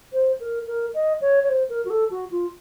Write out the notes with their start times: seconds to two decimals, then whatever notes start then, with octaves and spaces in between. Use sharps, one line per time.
0.13 C5
0.40 A#4
0.67 A#4
0.94 D#5
1.21 C#5
1.44 C#5
1.49 C5
1.69 A#4
1.85 F#4
1.90 A4
2.11 F#4
2.31 F4